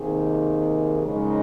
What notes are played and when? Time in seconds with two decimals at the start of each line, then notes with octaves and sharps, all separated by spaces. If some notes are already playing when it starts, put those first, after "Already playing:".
Already playing: C3 D#3 A#3 D#4 G#4
1.02 F#2 C#3 F3 G#3 D#4